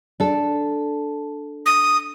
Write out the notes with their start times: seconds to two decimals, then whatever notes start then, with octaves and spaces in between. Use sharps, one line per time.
0.20 D4 A4
1.66 D#6